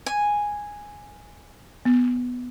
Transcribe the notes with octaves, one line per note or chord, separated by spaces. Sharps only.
G#5
B3